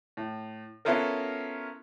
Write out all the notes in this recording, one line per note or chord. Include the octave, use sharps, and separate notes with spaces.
A2
B3 C#4 E4 F4 A4 A#4